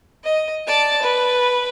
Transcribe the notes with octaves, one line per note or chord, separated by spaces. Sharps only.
D#5
D5 A5
B4